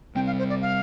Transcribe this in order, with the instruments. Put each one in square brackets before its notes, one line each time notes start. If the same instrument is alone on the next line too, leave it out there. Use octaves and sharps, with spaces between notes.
[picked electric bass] C3 G3 C4 [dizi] G5
[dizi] F5
C5
D5
F5